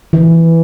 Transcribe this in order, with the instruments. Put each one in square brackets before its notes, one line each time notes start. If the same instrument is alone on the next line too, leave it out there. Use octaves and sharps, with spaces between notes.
[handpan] E3